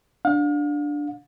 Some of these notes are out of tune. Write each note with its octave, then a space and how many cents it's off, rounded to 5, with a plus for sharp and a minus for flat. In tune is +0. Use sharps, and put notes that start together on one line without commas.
D4 +0 F5 +40